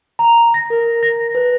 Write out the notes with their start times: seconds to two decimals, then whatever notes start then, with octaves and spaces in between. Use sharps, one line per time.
0.19 A#5
0.54 A#6
0.70 A#4
1.03 A#6
1.35 B4